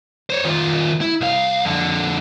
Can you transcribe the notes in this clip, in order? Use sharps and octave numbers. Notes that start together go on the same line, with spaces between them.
C5 C#5
D#3 F4
E4
C2 F5
F2 D3